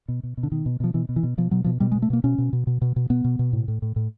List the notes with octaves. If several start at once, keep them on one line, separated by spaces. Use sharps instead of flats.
B2
B2
B2
D3
B2 D#3
B2
B2 F3
B2 E3
B2
E3
B2
B2 F3
B2 F#3
B2 F3
B2 G3
G#3
B2
A3
B2 A#3
B2 C#4
B2
B2
B2
B2
B2
B2 B3
B2
B2
A2
A2
A2
A2